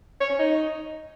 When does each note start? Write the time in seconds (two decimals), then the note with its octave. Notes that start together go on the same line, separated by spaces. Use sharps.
0.20 C#5
0.30 C#4
0.39 D#4